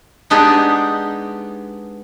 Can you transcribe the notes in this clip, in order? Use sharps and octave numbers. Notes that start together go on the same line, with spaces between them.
G#3 B3 D4 D#4 G4 G#4